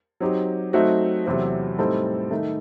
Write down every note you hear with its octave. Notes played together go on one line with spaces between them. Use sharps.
F#3 C4 D#4 G4
F#3 A3 C4 D#4 F#4
E2 C3 F#3 A3 C4
A2 G3 C4 D#4 A4
D#3 A3 D#4 A4